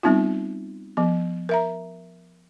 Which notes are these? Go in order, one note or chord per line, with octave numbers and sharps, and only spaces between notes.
G3 B3 C4 D#4 F4
F3 B3
A#4 E5 A#5